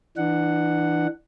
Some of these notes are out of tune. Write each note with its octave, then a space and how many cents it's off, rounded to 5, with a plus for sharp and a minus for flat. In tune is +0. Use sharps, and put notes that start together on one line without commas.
E3 +0 D4 +30 F#5 +0